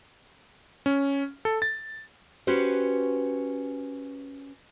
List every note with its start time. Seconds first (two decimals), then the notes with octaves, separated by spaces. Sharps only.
0.86 C#4
1.45 A4
1.62 A6
2.47 C#4 F#4 G4 B4 C5